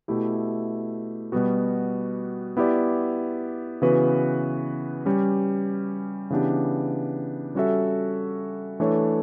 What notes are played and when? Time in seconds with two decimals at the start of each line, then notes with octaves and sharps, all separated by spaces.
0.08 B2 A3 E4 G4
1.32 B2 G3 B3 F#4
2.57 B3 E4 G4 D5
3.82 C#3 E3 B3 F#4 B4
5.06 G3 C#4 G4
6.30 C#3 E3 B3 D4 G4
7.55 G3 C#4 F#4 A4 E5
8.80 E3 A3 D4 A4 C#5